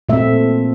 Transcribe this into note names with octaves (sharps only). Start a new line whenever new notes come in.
A#2 A3 C4 E5